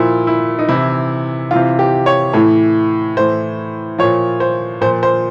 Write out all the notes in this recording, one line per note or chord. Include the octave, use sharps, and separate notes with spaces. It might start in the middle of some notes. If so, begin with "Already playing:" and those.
Already playing: A#2 F3 E4
E4
D#4
C3 E3 E4
C3 E3 F4
G4
C#5
A2 E3
A2 E3 C5
A#2 F3 C#5
C5
A#2 F3 C5
C5